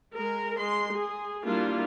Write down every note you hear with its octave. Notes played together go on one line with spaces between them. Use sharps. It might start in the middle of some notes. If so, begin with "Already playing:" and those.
G#3 A#4
G#3 C6
G#4
G3 A#3 D4 E4 F4